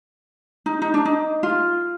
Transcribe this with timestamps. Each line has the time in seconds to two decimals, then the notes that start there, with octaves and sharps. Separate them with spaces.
0.66 D#4
0.82 D#4
0.94 D4
1.05 D#4
1.43 F4